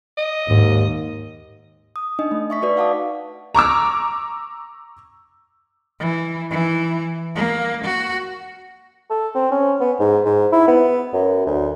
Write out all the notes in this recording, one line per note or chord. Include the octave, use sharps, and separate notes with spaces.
D#5
D#2 G#2
D#6
D4 D#4 D#5
A3
E5 C#6 B6
D#4 F#4 B4 D5
F5 F#5 A5 D6 D#6
A#5 C#6 D6 E6
E3
E3
A#3
F#4
A4
C4
C#4
B3
G#2
G#2
E4
B3
F#2
D2